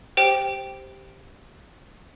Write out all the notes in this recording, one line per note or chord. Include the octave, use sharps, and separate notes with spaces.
G4 C5 G5